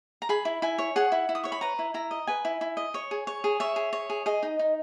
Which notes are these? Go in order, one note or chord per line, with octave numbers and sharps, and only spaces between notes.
A#5
G#4 B5
E4
E4 G#5
C#5
G#4 F#5
E4
E4
D#6
C#5 C#6
B5
B4 A#5
E4
E4 A#5
D#5
B4 G#5
E4
E4
D#5
C#5
G#4
C#5
G#4
C#5 E5
G#4
C#5
G#4
G#4 D#5
D#4
D#4